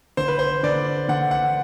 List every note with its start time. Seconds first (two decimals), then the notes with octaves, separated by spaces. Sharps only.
0.17 D3 C5
0.28 B4
0.39 C5
0.63 D3 D5
1.08 D3 F#5
1.31 F#5